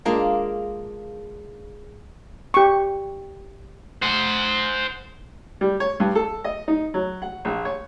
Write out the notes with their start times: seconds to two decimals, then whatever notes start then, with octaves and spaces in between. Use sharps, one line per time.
0.05 G#3 A#3 D4 F4
2.54 G4 C#6
4.02 C5 F#5
5.61 G3
5.80 C#5
6.00 G2
6.15 A4
6.44 D#5
6.68 D#4
6.94 F#3
7.22 F#5
7.45 A#1
7.65 C#5